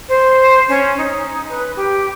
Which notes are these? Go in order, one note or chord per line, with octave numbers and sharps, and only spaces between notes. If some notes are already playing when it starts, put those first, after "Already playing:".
C5
C#4
D#4
B4
G4